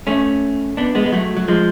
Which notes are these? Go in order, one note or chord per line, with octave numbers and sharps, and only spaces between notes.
A3 C#4
B3 D4
G#3 B3
G#3
F#3 A3
F#3
F3 G#3